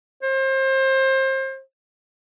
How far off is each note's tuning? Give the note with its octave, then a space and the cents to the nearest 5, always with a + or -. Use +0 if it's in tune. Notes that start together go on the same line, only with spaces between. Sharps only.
C5 +30